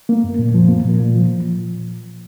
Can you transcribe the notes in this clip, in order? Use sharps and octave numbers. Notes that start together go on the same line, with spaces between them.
A#3
F#2
A#2
F3
A#3
A#2
A#2
F3